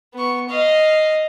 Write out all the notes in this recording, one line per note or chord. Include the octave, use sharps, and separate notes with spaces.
B3 C#6
D#5 F5